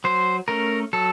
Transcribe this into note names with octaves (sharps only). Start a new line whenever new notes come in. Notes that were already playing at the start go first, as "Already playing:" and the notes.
F#3 C5
A3 C#4 A#4
F#3 A4